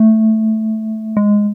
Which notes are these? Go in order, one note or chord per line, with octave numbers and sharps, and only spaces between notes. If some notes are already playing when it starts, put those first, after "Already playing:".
Already playing: A3
G#3